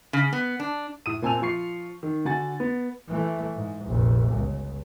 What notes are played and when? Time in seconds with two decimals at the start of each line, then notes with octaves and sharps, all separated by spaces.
0.13 C#3
0.33 B3
0.60 D4
1.06 A2 D#6 D#7
1.22 A#2 C4 G#5 A5 E6 F7
1.41 F3 F4 C#6 C7
2.03 D#3
2.25 D3 F#4 F#5 G#5 A6
2.60 B3
3.08 E3 A3
3.56 G#2
3.85 F1 A#1
4.32 G1 C#2